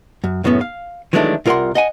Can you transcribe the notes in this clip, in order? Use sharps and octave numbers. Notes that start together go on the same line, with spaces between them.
F#2
F#2 A2 C#3 B3 C#4
F5
D#3 E3 F#3 G#3 A3 D4
C2 F4 A#4 D#5 F#5 C6
D#5 F#5 G#5